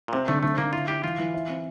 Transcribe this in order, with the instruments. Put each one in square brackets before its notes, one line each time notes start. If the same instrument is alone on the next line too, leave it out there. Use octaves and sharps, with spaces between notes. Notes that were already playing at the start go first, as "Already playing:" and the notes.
[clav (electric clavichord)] A#2
[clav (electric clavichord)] C3 [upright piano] C4
[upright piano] D3 [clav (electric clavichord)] A3
[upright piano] D3 [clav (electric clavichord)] A3
[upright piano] D3 [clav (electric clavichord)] A#3
[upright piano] E4 [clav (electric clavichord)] F4
[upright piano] E4 [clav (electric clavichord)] G4
[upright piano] E3 [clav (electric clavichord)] F4
[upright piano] E3
E4
C4